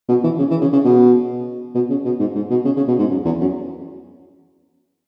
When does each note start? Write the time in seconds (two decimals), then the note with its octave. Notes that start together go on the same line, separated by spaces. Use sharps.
0.08 B2
0.23 E3
0.38 C#3
0.50 E3
0.61 C#3
0.72 C#3
0.84 B2
1.74 B2
1.89 C#3
2.05 B2
2.20 G#2
2.35 G#2
2.50 B2
2.65 C#3
2.76 C#3
2.88 B2
2.99 G#2
3.10 F#2
3.25 E2
3.40 F#2